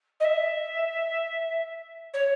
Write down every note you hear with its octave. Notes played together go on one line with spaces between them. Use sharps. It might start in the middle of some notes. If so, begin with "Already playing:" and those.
D#5
E5
C#5